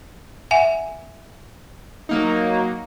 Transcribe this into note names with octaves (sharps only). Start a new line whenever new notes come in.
E5 F#5 G#5
F#3 A#3 D#4